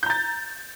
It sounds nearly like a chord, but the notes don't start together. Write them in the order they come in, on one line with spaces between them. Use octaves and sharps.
G6 A#5 A6